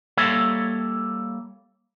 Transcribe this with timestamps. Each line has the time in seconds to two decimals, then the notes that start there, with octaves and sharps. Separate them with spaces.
0.17 G3 A#3 A4 C#5 E5